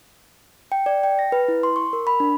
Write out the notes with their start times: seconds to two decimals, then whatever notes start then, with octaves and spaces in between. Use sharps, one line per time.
0.72 G5
0.86 D5
1.03 G5
1.19 A#6
1.32 B4
1.48 E4
1.63 C6
1.76 C#6
1.93 A#4
2.07 B5
2.20 D4